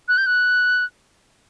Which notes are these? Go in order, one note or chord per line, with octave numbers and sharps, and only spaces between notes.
F#6
G6
F#6